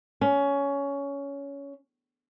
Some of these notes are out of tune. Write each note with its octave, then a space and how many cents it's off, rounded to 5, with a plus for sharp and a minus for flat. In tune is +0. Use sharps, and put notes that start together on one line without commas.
C#4 +15